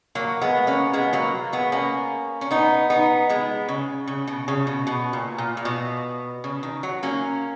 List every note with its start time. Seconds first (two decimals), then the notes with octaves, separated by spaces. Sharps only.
0.15 F#3 A#3
0.41 G#3 B3
0.67 A#3 C#4
0.93 G#3 B3
1.13 F#3 A#3
1.53 G#3 B3
1.72 A#3 C#4
2.41 C#4
2.51 B3 D#4
2.90 B3 D#4
3.29 G#3 B3
3.68 C#3
4.07 C#3
4.27 B2
4.48 C#3
4.67 B2
4.87 B2
5.13 A#2
5.38 A#2
5.57 A#2
5.65 B2
6.44 C#3
6.63 D#3
6.83 F#3
7.03 A#3 C#4